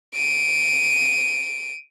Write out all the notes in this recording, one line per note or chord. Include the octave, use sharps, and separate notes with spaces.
D7 D#7